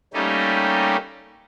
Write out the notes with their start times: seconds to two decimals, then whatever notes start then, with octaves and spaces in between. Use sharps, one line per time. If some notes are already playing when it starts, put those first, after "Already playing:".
0.14 G3 A3 A#3 C#4 D#4 G4